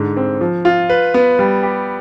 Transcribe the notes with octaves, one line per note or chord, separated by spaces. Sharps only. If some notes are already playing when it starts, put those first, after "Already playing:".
Already playing: G#2 D3
C4
F3
F4
B4
B3
G3
G4